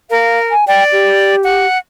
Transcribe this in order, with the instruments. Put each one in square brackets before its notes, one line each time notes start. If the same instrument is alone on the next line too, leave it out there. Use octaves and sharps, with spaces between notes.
[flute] A#4 [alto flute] F5
[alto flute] G#5
[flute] D5 [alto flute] G5
[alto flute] G4
[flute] F#5